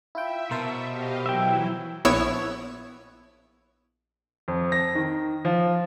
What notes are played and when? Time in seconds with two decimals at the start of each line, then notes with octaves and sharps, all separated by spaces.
0.15 E4 F4 E5 G5
0.51 B2 A#4 C5 A5
0.88 G4 D#5 F5
1.26 E3 F#3 E4 E5 G5
2.05 A#1 B3 E4 C#5 E6 E7
4.48 F2
4.72 A#6
4.95 D#3
5.45 F3